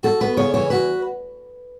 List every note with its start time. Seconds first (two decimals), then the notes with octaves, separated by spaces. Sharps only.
0.03 F#4 A4
0.21 B3 B4
0.37 C#3 C#5
0.54 E3 C#5
0.70 F#4 B4